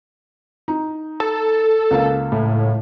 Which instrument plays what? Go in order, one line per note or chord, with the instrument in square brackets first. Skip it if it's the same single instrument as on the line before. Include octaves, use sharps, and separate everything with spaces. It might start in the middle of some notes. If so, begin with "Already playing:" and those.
[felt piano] D#4
[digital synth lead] A4
[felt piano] C#2 A#3 F5
[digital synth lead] A2